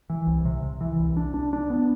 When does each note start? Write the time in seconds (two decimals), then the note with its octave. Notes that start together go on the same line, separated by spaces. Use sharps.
0.10 E3
0.27 C2
0.45 C3
0.63 C3
0.81 E3
0.99 C2
1.17 D4
1.34 D4
1.53 D4
1.70 B3